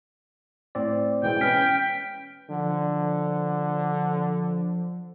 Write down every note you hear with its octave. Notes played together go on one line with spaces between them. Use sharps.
A2 C4 D5
B2 E3 G#3 G5
C#4 B4 F6 B6 D7
D3 F3